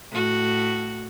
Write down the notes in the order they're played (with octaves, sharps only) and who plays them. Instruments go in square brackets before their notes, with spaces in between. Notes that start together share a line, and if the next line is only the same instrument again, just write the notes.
[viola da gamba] A2 F#4